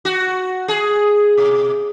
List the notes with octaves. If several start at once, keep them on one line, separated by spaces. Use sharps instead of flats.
F#4
G#4
B2